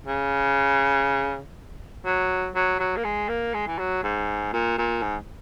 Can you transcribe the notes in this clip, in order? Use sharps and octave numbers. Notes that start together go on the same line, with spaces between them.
C#3
F#3
F#3
F#3
A#3
G#3
A#3
G#3
E3
F#3
G#2
A#2
A#2
G#2